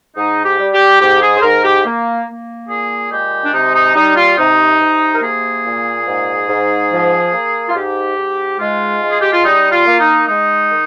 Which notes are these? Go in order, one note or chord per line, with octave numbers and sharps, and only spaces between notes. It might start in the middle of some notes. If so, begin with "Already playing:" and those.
G#2 D#4
G4
G3
G4
G#2 G4
G#4
C5
G#2 A#4
G4
A#3
A#3
A#2 G#4
G#3 G4
D4
C3 D#4
D#4
G3 D#4
F4
C3 D#4
C3
A#4
A#3 G#4
A#2
G#2
G#2
F3
A#3
F4
G#2 G4
G#2
G#3 F4
G#3
G#4
G4
F4
G3 D#4
F4
A#3
D#4
G#3 D#4
D#3